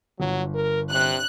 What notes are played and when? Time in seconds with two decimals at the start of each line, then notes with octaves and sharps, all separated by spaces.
0.20 G1 F#3
0.54 A#4
0.92 C3 F#6